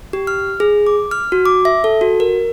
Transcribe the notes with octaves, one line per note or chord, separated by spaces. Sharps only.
G4
F6
G#4
D6
F6
F#4
D6
E5
A4
F#4
A#4